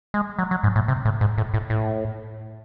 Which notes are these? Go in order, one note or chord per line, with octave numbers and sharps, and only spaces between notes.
G#3
F#3
F#3
G#2
A2
C3
A2
G#2
A2
A2
A2